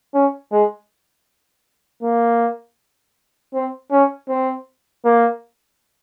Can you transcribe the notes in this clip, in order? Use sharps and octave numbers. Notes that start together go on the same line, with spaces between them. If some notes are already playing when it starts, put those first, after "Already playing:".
C#4
G#3
A#3
C4
C#4
C4
A#3